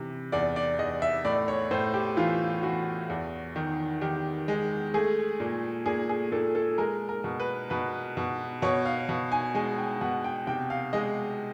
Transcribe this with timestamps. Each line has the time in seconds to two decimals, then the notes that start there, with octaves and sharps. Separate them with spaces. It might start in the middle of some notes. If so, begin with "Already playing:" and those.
Already playing: C3 E3
0.32 E2 D5
0.56 D5
0.79 E2 D#5
1.02 E5
1.25 A2 D5
1.48 C#5
1.71 A2 C5
1.94 G4
2.17 E3 F4
2.63 E3 F#4
3.09 E2
3.56 D#3
4.01 D#3 G4
4.48 G#3
4.94 A3 G#4
5.40 A#2
5.86 A#2 G#4
6.09 G#4
6.32 A#2 A4
6.55 A4
6.78 G#3 A#4
7.09 A#4
7.24 B2
7.40 B4
7.70 B2 B4
8.17 B2
8.62 B2 C#5
8.85 F5
9.09 B2
9.32 G#5
9.55 G#3 G#5
9.78 G5
10.01 B2 F#5
10.24 G5
10.47 C3 G5
10.70 F5
10.93 G#3 D#5